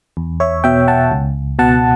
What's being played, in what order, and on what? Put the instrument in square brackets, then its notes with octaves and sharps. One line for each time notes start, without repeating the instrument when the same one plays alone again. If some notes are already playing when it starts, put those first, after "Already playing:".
[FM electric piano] E2
C#5 E5
B2 E5 G5
F#5 A5
C#2
B2 F#5 A5